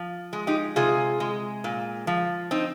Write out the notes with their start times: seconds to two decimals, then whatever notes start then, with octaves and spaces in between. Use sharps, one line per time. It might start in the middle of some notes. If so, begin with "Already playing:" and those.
Already playing: F3
0.33 G#3
0.47 D#4 G4
0.76 C3 F4 G#4
1.20 G#3
1.64 A#2
2.07 F3
2.51 C4 D#4